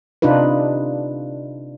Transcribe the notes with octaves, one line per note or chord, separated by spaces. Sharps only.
C3 D4 D#4 F4 B4